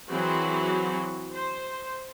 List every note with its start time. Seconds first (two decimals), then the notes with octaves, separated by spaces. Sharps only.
0.10 E3 F#3 C4 F#4 G#4
1.33 C5